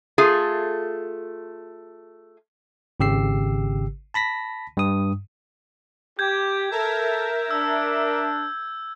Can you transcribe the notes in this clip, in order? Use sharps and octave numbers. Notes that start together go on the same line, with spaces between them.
A3 F4 G#4
G#1 C#3 G4 E6 C7
A5 B5 A#6 B6
G2 D#6
G4 G6 G#6
A4 A#4 E5
D4 E6